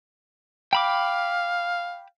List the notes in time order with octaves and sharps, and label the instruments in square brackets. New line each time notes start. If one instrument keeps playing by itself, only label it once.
[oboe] F5 [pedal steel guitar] G5 B5 D6